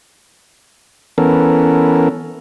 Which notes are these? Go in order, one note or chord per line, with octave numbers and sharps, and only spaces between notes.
E3 B3 C#4 A4 A#4